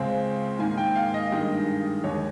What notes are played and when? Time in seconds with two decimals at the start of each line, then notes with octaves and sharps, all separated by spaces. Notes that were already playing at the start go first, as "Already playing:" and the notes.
Already playing: C#2 C#3 G#3 C4
0.59 G#2 D#3 A#3 G#5
0.78 G5
0.95 F5
1.14 D#5
1.31 G2 D#3 G#3
2.04 D#2 D#3 G#3 C#5